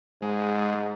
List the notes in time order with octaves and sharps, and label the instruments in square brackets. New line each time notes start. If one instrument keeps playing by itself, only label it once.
[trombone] G#2 [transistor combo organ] G#3